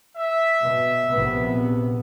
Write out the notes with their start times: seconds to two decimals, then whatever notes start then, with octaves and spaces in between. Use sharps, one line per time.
0.16 E5
0.60 B2
1.09 A#1 C3 B3